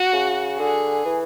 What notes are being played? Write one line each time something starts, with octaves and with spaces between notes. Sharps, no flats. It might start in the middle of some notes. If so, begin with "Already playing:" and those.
Already playing: F#4
C#3
D3 G#4
E3